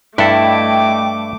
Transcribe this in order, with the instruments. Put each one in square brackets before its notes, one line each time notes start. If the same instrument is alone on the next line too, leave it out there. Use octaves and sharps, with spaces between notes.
[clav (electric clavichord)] G2 A4 [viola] A3 D6 [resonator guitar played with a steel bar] E4 [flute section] D#5 G5